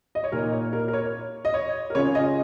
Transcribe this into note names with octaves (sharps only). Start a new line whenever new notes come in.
D#5
C#5
A#2 A#3 D#4 A#4
C#5
A#4
A#4
C#5
D#5
C#5
A#4
C#3 G#3 C#4 F4 C#5
D#5